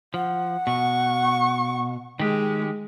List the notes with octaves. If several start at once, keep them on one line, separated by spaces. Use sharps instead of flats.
F3 F#5
B2 C#6
D#3 G#3 G4